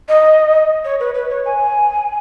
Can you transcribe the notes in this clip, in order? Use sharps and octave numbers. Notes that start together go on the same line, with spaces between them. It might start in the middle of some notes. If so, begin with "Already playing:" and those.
D#5
C#5
B4
B4
C#5
G#5